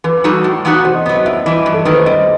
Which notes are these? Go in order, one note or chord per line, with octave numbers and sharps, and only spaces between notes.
E3 B4
G3 D#4 F#4 A4
A2
E3 B3 D#4 F#4
C3 C5
D#5
F#3 B3 D#5
D#5
A2 E5
E3 G3 D#5
G2
A4
D#3 A3 E4 B4
C5
G3 D#5